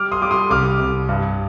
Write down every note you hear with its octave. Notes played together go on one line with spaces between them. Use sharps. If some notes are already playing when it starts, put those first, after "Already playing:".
Already playing: G3 D6 F6
C6 D#6
G3 D6
C6 D#6
C2 D6 F6
C2
G2